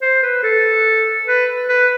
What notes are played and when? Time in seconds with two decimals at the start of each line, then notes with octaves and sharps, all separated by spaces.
0.02 C5
0.23 B4
0.43 A4
1.27 B4
1.69 B4